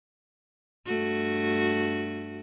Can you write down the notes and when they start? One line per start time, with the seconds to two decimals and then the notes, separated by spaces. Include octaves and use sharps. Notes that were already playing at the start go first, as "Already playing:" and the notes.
0.86 G2 A3 F#4